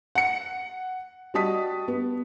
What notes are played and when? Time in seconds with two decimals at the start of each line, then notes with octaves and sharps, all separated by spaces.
0.15 F#5 C#7
1.34 G3 F#4 D#5 A5 D#6 B6
1.88 B3